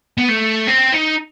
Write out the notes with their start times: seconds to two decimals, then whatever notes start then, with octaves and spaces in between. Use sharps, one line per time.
0.18 B3
0.28 A3
0.67 C4
0.93 D#4